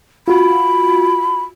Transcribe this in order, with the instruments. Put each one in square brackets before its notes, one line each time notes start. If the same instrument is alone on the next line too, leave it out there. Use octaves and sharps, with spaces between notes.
[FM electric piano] F4 F#4 [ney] B5